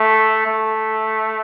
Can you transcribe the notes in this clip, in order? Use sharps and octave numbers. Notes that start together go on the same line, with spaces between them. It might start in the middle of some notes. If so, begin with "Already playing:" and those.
Already playing: A3
A3